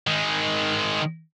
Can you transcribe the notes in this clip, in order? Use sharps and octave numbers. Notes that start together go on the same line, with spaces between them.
D#3 G#3